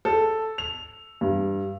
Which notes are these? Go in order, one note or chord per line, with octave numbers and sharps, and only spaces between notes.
A4
F7
G2